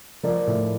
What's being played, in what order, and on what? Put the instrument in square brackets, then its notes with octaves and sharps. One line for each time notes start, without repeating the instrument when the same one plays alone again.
[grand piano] F3 A#4 D5
A2